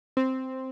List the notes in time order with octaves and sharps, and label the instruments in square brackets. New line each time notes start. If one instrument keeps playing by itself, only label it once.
[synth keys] C4